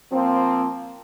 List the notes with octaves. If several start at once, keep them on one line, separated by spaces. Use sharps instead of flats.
F3 A#3 C4